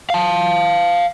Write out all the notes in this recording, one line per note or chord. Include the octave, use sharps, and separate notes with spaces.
F5 A5